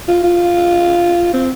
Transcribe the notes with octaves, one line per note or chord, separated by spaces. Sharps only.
F4
F4
C4